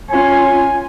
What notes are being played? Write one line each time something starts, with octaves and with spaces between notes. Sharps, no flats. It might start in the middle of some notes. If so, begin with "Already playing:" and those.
C#4 F4 G#5